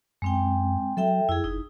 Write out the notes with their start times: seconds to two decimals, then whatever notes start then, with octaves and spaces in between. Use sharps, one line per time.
0.22 F#2 G#3 C4 G5
0.97 F#3 A4 E5 G5
1.29 F2 E4 G#4
1.44 F#1 D#4